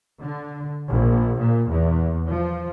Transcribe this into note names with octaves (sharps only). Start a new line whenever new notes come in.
D3
A#1
A#2
E2
F3